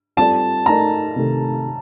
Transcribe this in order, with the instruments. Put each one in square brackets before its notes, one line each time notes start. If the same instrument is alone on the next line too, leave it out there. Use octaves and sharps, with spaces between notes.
[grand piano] G3 C4 F4 A4 D5 [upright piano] A5
[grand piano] A3 D#4 A#4 D5 [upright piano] A#5
[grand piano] C3 D#3 A3